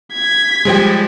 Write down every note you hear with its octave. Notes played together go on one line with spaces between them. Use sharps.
G#6 B6
F3 G3 G#3 G#4 C5 G5